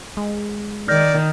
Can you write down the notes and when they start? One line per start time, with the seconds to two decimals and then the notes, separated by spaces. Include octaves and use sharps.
0.17 G#3
0.88 D#3 D5 F6 G6 A#6